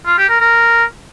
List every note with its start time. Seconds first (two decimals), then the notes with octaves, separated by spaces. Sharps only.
0.07 F4
0.18 G4
0.29 A#4
0.41 A#4